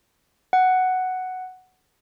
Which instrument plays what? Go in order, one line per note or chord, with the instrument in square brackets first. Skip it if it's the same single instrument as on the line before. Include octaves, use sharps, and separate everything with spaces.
[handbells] F#5